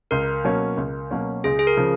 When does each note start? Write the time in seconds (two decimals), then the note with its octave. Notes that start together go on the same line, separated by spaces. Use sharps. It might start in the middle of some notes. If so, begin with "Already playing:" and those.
0.11 C#2 A#4
0.44 B2 F#3 A#3 C#4
0.77 C#2
1.11 B2 F#3 A#3 C#4
1.44 C#2 G#4
1.59 G#4
1.67 A#4
1.77 C#3 F3